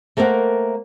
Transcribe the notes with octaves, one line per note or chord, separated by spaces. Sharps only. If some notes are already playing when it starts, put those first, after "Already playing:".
A3 A#3 A#4 C5 E5 F#5